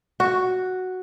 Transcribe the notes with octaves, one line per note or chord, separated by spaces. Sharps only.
F#4